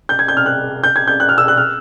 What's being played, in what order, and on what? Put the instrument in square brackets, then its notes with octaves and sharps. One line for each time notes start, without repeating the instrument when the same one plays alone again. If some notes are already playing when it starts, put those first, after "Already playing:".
[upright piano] G6
G#6
G6
F6
F#6
G6
G#6
G6
F#6
F6
E6
F#6
F6